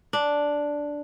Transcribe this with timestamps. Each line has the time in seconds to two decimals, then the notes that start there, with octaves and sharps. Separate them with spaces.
0.13 D4